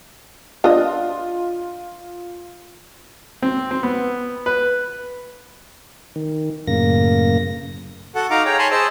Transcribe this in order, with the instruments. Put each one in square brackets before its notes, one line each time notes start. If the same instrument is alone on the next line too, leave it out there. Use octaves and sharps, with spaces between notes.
[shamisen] D4 D#5 [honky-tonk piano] F4
[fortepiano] C4
C4
B3
B4
[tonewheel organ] D#3
F#2 A2 C#3 A#3 A#6
[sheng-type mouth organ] F#4 A4 F#5
D#4 F#4 F5 A#5 D6
G#4 C#5 G5 A#5
C#5 G#5 A5 B5 C6
G#4 C5 D#5 A5 E6